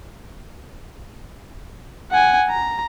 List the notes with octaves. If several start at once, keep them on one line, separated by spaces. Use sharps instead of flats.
F#5 G#5
A#5